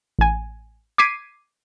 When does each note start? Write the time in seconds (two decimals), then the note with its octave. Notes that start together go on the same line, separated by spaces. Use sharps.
0.19 A1 G#5
0.98 D6 G#6 B6 C7 D7 D#7